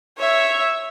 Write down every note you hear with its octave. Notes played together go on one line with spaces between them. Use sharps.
C#5 E5